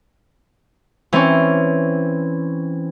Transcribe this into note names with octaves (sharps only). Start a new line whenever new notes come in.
E3 C4 C#4